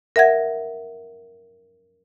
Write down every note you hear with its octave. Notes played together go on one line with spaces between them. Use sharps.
A#4 E5 F#5 G#6